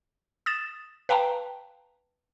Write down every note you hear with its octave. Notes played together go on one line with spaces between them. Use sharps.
D#6 A6 E7
B4 F5 G5 A5 A#5